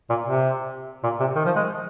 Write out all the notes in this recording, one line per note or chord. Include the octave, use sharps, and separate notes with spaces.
A#2
C3
A#2
C3
D#3
F3
G#3